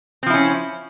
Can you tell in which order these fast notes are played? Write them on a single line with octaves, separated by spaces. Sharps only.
C4 F3 E4 C#4